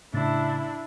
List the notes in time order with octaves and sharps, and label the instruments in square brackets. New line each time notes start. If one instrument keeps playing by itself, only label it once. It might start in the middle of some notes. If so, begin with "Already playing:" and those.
[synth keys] A2 C#3 A6 [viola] D4 E4